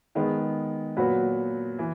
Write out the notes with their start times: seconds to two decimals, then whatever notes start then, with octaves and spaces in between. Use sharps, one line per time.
0.15 D#3 G#3 B3
0.97 A#2 F#3 B3 F#4 B4
1.79 E3